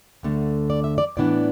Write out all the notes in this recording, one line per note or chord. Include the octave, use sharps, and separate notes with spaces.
D2 D3 A3
D5
E5
D5
A2 E3 B3 D4 D5